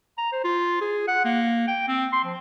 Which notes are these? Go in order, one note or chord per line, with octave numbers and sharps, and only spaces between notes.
A#5
C5
F4
G#4
F#5
A#3
G5
C4
C6
F3